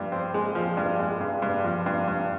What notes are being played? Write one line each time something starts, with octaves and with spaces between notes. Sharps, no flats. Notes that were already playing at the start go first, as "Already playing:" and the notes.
Already playing: G2 F3
C4
G#3
F3
G2
G#3
G2
G2
F3
G2
G2